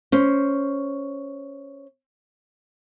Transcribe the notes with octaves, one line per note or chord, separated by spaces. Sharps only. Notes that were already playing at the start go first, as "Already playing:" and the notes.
C#4 C5